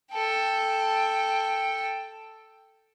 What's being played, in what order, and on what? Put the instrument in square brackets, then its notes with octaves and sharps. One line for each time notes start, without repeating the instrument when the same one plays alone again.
[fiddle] A4 G5